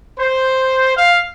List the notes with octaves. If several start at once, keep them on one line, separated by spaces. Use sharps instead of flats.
C5
F5